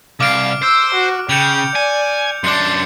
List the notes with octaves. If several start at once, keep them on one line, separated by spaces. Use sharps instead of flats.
C2 F5 D6 F6 D7
C5 E6
F#4
C#3 G5 G6 C#7 F7
D5 G#5
F#2 D4 C6 D6 C#7